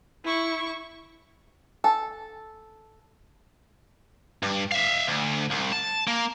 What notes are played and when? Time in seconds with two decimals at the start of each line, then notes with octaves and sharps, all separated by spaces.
0.25 E4 C#6
1.84 A4
4.43 G2
4.72 E5 F5
5.07 D2
5.50 C2
5.72 A5
6.07 A#3